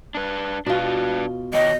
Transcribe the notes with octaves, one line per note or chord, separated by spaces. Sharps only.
D4 B4
B2 D4 F4 B4
D#3 C#5 D#5 G5